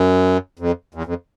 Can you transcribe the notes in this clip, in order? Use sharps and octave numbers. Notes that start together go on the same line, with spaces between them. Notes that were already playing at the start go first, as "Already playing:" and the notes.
Already playing: F#2
F2
E2
F2